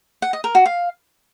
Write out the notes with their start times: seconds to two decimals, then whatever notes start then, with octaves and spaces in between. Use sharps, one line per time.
0.22 F#5
0.33 D#5
0.44 A#4
0.55 F#4
0.66 F5